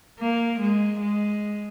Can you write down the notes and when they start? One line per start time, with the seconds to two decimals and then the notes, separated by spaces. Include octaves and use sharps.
0.19 A#3
0.60 G#3
1.00 G#3